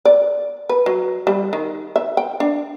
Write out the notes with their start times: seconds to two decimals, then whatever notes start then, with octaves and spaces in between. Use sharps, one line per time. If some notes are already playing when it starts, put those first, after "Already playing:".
0.05 D5
0.69 B4
0.86 F#3
1.27 G3
1.53 D#3
1.96 E5
2.17 G5
2.40 D4